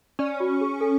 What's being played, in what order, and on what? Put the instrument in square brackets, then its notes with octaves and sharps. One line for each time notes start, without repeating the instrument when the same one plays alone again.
[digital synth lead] C#4 [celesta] D5
[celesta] F#4
G#4
A4